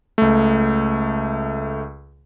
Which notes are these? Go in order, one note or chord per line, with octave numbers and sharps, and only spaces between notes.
C#2 A3